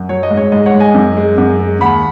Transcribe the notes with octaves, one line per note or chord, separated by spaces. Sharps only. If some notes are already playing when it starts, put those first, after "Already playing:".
Already playing: F#2
F#3 C#5
D#5
G#2
C#5
G#2 D#5
C#5 F#5
G#2
D#5 G#5
F#2
G#3
F#2
G#3
D#2 F#5 B5